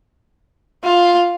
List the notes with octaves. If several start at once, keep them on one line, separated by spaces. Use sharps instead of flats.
F4